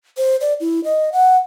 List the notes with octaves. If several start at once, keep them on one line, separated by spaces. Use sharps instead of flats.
C5
D5
E4
D#5
F#5